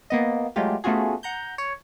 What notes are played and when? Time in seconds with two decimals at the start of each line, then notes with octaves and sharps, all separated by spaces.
0.10 A#3 B3 D#5
0.56 F#3 G#3 A3 F4 G4
0.84 A3 B3 C#4 F4 F#4 G#4
1.23 F#5 A#5 G6
1.58 C#5